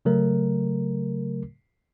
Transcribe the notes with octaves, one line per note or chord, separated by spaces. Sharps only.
C#3 F#3 A3 A#4